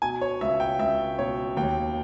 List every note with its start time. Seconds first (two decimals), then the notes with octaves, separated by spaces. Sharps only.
0.02 B2 G#5
0.21 C#5
0.41 C#2 E5
0.60 G5
0.79 C#2 E5
1.19 B2 C#5
1.57 D#2 G5